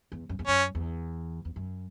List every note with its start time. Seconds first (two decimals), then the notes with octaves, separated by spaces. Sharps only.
0.12 E2
0.29 F#2
0.39 E2
0.47 F#2 C#4
0.75 E2
1.45 E2
1.56 F#2